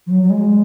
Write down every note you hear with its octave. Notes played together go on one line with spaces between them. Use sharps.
F3
F#3
F#3
G#3